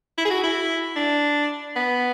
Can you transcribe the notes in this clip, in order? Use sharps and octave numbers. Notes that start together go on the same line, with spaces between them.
E4
G#4
F#4
E4
D4
B3